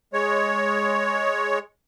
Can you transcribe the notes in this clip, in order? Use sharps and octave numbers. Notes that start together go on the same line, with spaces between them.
G#3 C#5